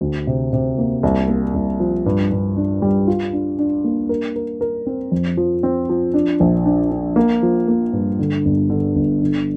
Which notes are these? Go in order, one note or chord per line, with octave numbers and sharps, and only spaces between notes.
D2
C3
C3
A#3
C2
A#3
C2
F3
G2
G2
D4
G3
F4
D4
D4
A#3
A#4
A#4
A#4
C4
F2
F3
C4
F3
D4
A#1
D4
D4
A#3
F3
A#3
G2
D3
G1
D3
G1
D3